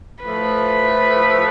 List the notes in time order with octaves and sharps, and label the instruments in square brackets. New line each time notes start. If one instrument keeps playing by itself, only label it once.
[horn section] A2 F3 A3 [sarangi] B4